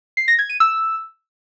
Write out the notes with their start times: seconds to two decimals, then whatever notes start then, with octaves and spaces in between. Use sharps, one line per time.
0.17 C7
0.28 A#6
0.39 G#6
0.49 D#7
0.60 E6